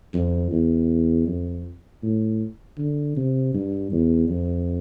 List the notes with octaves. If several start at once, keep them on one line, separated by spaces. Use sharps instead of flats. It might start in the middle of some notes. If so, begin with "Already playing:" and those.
F2
E2
F2
A2
D3
C3
G2
E2
F2